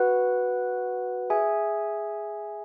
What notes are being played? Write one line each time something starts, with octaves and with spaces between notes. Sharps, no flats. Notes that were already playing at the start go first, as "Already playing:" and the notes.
Already playing: F#4 B4 F#5
G#4 E5 G#5